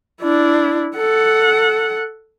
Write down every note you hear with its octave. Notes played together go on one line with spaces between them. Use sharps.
D4 E4
A4 F#5